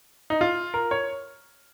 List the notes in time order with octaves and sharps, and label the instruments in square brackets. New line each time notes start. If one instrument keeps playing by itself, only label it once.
[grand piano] D#4
F4
A#4
C#5